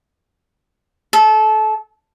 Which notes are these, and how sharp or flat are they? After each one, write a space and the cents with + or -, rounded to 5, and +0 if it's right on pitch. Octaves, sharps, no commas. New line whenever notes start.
A4 -25